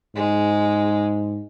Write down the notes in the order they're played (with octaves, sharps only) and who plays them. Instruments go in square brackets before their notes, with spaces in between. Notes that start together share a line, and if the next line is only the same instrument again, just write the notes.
[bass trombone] G#2 [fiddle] G#3